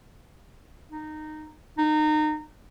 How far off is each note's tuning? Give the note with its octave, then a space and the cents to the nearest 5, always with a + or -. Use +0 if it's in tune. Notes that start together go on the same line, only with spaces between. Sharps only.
D#4 -15
D#4 -25